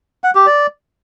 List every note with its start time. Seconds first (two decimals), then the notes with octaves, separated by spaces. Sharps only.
0.24 F#5
0.35 G4
0.47 D5